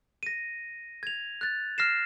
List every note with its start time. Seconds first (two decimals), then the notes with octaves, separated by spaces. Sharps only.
0.23 A#6 D#7
1.03 G#6 F7
1.41 F#6 A6
1.78 F6 A#6 C7 E7